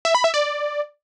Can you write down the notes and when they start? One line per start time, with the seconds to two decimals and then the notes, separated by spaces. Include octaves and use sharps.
0.05 E5
0.15 B5
0.24 E5
0.34 D5